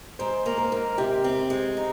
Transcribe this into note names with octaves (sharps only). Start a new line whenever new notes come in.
G#2 C5
A#3
A#4
G#2
C3 G4
C4
G#3
D#4